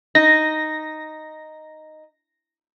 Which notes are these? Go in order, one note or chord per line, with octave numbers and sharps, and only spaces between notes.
D#4 A#6